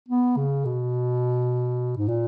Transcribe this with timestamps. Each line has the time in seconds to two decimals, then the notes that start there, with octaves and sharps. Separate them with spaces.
0.08 B3
0.37 C#3
0.65 B2
1.97 G#2
2.08 A#2